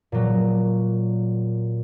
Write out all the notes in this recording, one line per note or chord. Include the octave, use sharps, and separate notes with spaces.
A#2 F#3